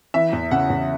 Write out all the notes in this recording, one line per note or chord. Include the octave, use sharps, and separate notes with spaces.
E3 E5
E2
C#3 F#5
E2